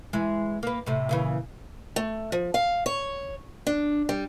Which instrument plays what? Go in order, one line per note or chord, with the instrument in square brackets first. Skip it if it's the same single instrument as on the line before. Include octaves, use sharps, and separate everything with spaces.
[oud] E3 G#3
A#3 B4
A2 C3
A#2 C#3 E3
[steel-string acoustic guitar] A3
F3
F5
C#5
D4
G3